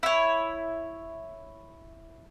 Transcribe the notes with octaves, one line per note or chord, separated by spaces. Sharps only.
E4 C#5